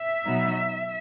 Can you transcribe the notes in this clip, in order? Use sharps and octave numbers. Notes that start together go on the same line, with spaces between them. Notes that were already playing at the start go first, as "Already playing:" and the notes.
Already playing: E5
B2 F#3 B3 D#4